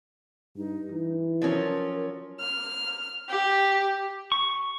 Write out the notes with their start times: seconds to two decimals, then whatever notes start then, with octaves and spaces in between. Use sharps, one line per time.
0.57 G2 D#4
0.92 E3
1.42 F3 F#3 C#4 A#4
2.39 F6
3.29 G4
4.32 C#6